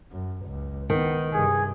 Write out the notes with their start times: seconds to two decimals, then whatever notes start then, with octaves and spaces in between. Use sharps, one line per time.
0.12 F#2
0.46 C#2
0.90 D#3 B3
1.33 G2 C3 G#4